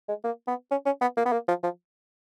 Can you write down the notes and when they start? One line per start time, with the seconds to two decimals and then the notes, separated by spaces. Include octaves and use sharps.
0.08 G#3
0.24 A#3
0.47 B3
0.71 C#4
0.86 C#4
1.01 B3
1.17 A#3
1.26 B3
1.32 A#3
1.48 F3
1.63 F3